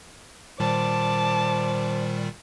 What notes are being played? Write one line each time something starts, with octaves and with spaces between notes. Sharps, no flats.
A#2 D#3 G3 C5 A5 D6